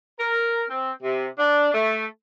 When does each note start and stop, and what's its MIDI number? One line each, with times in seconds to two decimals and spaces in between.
0.19 0.63 70
0.70 0.91 60
1.02 1.27 48
1.39 1.70 62
1.74 2.05 57